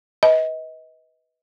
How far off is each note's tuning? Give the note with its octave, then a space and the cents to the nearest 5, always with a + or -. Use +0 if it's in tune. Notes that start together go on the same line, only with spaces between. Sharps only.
B4 +0 D#5 +30